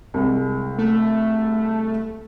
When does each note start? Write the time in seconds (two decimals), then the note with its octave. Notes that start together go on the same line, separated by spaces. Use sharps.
0.14 C2 C3 G#3
0.78 A3